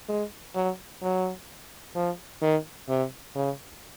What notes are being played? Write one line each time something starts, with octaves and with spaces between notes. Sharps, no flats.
G#3
F#3
F#3
F3
D#3
C3
C#3